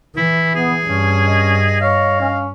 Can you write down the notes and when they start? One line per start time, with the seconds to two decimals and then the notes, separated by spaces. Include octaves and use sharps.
0.16 E3 E4
0.55 B3 G#4
0.85 G2 C#4
1.27 D#5
1.81 C#5 F5
2.21 C#4